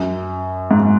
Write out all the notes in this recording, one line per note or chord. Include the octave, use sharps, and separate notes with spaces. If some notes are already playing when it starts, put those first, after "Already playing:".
Already playing: F#2
G#2